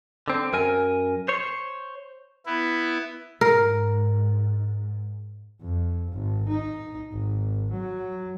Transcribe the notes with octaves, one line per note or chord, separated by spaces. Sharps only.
D3 C4
F#2 A#4 G#5
C5 C#5
B3 E4
G#2 A#4
F2
G#1
D#4
G#1
F#3